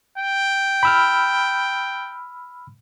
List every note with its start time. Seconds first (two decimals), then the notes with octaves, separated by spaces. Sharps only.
0.18 G5
0.83 B5 E6 F6